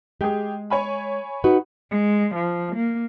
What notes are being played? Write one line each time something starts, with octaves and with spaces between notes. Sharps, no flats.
G#3 G4 G#4
C#5 G#5 B5
D#4 F#4 B4
G#3
F3
A#3